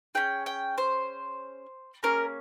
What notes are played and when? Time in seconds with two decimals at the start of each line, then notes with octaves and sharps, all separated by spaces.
0.15 C#4 G#4 G5
0.46 G5
0.78 C5
2.03 A#3 C#4 G#4 A#4